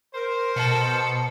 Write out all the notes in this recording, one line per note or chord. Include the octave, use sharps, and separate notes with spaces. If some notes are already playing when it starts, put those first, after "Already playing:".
A#4 C5
B2 A4 C#7